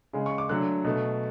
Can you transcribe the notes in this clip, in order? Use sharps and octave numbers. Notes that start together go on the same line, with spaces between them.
C#3 G#3
C#6
D6
D3 F#3 A3 F#6
B2 A3